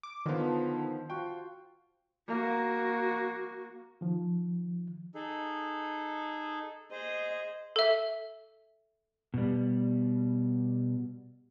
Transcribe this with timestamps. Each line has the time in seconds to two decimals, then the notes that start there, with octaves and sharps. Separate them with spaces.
0.03 D6
0.26 D3 D#3 B3 F4 C5
0.40 F3
1.10 F4 F#4 G5
2.28 A#3 F#4
4.01 D#3 F3
5.15 D#4 G#4 A4
6.91 G#4 C5 D#5
7.76 A4 E5
9.34 B2 G3